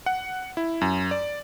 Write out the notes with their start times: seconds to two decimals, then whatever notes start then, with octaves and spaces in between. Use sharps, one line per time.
0.06 F#5
0.57 E4
0.81 F#2
1.11 D5